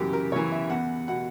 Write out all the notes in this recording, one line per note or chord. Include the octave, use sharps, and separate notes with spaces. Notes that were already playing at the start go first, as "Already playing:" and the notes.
Already playing: F#2 C#3 E3 G4 A#4
A#4
C#3 E3 C#5
E5
E2 F#5
B2 F#5